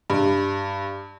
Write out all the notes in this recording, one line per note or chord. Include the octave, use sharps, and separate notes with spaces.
G2